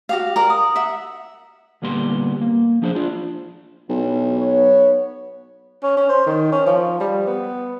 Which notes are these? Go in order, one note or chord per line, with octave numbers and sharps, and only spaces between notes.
F#4 G4 F5
A#4 D5
D#6
E5 F#5
D2 A#2 G3 B3 C6
A#3
F3 D4 G#4 A4 C5
D4 F4 D5
B1 G2 B2
B3 C#5
C#4
C#4
C5
D#3
C#4
F3
G3
B3